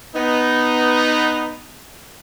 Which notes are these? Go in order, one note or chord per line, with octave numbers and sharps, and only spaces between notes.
B3 D#4